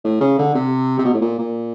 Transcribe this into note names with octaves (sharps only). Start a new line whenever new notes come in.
A2
C#3
D3
C3
C3
B2
A2
A#2
A#2